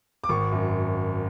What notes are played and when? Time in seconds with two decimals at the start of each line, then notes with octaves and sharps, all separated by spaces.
0.24 D6
0.29 G#1 C#6
0.52 F#2